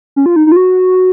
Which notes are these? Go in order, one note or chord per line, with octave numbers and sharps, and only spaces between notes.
C#4
F4
D#4
D#4
F4
F#4